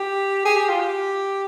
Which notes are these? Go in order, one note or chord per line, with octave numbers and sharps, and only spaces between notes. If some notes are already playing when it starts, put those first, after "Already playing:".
Already playing: G4
G#4
G4
F4
G4